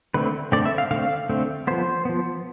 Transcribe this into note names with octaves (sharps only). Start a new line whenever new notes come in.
D3 A3 C4 B4
D3 A3 C4 D5
E5
F5
D3 A3 C4 F5
D3 A3 C4
F3 B3 C5
F3 B3